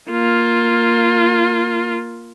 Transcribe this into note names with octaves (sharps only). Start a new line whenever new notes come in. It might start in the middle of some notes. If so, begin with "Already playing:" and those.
A#3 F4